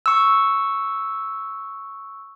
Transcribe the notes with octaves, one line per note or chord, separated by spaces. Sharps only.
C#6 E6